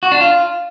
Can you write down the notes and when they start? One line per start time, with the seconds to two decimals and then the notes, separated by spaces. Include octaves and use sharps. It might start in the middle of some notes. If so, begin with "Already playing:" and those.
0.03 F#4
0.12 D4
0.21 F4